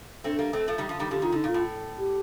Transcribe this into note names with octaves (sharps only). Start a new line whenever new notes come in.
A3 C4 D4
G3 A#3
A3 C4
F3 A3
D#3 G3
D3 F3
D#3 G3
D3 F3 G4
D#3 F4
D3 D#4
A#2
F4
A2
G4